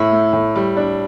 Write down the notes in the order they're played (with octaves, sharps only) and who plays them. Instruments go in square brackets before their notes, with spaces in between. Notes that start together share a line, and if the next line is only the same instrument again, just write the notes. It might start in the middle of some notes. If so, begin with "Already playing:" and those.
Already playing: [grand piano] A2 [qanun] E4
[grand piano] A3
A2
G3
D4